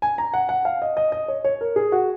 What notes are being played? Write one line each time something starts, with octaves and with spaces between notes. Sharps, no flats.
G#5
A#5
F#5
F#5
F5
D#5
D#5
D#5
C#5
C#5
A#4
G#4
F#4